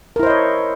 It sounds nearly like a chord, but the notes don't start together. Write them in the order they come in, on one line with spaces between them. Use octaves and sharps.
A#4 E4 C5 D#5 C#5